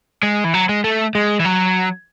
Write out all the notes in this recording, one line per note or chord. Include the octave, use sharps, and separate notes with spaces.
G#3
E3
F#3
G#3
A3
G#3
E3
F#3